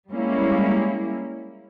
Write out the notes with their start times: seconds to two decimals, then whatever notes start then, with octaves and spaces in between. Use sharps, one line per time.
0.11 G3 G#3 A#3 C#4 E4